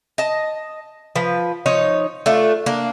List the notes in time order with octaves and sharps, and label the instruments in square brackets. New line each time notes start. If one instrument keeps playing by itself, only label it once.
[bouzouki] D#5 A5
F3 B4
F3 D#4 C#5
A3 D4 F4
A#3 D4